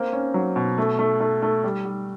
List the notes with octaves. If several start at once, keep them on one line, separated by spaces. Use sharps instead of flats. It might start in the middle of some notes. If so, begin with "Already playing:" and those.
Already playing: A#3 C4
C#4
F#3
B2
A3
A3
A3
A3
G3
G3